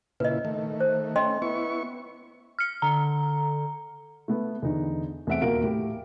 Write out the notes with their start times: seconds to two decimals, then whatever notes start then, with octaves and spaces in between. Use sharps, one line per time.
0.20 A#2 C#3 E4 B4 D#5
0.45 D#3 A3
0.80 C5
1.16 A3 C#4 D#5 G5 C6
1.42 B3 E4 C#6
2.59 F6 C#7
2.82 D3 A#5
4.28 A3 B3
4.62 E2 D3 D#4
5.27 E2 A3 C4 E5 F#5 D7
5.41 D#1 D#2 F#4 A#4 F5 D7
5.62 A2 G4